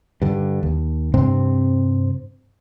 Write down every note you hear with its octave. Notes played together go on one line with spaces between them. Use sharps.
G2 D3
D#2
G2 C3 C4